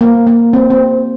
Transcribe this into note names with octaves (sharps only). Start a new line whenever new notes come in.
A#3
A#3
C4
C4